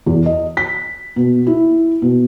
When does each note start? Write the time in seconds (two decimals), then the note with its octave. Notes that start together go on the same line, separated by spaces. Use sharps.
0.06 E2
0.26 D#5
0.57 B6
1.16 B2
1.47 E4
2.02 B2